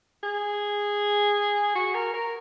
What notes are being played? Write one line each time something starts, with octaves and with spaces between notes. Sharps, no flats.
G#4
F#4
A#4
A#4